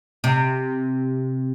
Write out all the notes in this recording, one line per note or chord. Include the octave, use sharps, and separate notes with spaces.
C3